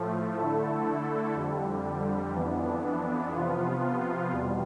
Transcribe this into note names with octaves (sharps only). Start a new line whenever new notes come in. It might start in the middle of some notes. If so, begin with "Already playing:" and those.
Already playing: A2 F3 A3
D3 A3 E4 A4
F2 D3 G3
F2 E3 B3 D4
C3 F3 B3 F4
E2 B2 G3